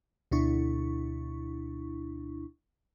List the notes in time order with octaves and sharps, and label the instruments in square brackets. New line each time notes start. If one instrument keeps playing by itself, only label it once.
[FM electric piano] D2 B2 D4 E4 C#6